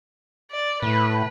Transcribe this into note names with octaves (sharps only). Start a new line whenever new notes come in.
D5
A2 B4